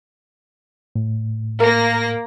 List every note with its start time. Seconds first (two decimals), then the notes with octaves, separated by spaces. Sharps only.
0.96 A2
1.60 A#3 A#4 A#6